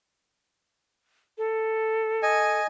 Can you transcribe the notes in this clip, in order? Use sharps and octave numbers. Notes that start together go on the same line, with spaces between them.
A4
D#5 G#5